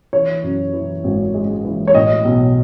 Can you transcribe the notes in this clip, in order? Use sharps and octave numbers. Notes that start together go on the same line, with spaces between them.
E3 C#5
F#2
E3
G#1
G#3
E3
C#5
A2 D#5
B1